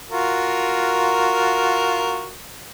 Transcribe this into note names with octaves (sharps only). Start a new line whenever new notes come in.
F4 F#4 A#4